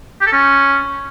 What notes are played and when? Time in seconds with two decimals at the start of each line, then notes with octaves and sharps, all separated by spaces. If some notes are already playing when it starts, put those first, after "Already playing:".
0.21 G4
0.27 A4
0.32 C#4